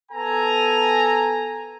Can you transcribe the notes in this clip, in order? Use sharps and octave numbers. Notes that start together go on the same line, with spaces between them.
B3 A4 G#5 A#5